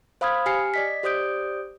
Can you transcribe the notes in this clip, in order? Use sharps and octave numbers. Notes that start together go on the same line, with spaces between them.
C5 F5 B5 D#6 F6 G#6
G4 G#5 F6 C7 C#7
D5 D#5 B6
G4 C5 D5 D#6 G6 D7